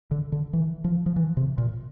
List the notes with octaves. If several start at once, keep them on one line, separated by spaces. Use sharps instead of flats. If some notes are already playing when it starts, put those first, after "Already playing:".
D3
D3
E3
F3
F3
E3
C3
A#2